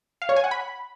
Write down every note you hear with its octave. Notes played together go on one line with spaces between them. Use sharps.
F5
C#5
G#5
F#5
B5